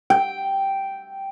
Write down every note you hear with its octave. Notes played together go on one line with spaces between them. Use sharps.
G5